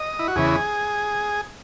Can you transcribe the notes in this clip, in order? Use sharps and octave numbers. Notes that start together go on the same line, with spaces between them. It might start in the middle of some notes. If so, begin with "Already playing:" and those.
Already playing: D#5
E4
F#4
E2 C#3 E3 G#4